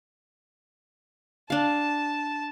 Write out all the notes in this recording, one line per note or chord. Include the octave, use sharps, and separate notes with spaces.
D4 F5 A5